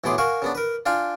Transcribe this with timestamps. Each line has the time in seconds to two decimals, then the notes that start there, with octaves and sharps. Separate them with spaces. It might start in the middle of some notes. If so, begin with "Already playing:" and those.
0.04 B1 A2 B3 G#4 C6 D6
0.18 F#4 A#4 F5 G#5 C#6
0.42 C#3 B3 D4
0.55 A#4 B4
0.86 D4 F4 F5 G5 G#5